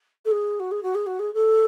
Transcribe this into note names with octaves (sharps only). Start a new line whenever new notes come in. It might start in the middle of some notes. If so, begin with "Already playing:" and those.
A4
G#4
F#4
G#4
F#4
G#4
F#4
G#4
A4